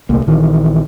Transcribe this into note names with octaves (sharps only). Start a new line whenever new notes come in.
D#1 C2 A3 A#3
A#1 D#3 E3